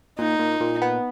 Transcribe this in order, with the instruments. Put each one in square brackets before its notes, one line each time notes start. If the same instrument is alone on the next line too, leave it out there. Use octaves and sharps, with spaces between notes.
[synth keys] A#2 [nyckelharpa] D#4
[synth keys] A#2
A#2
B3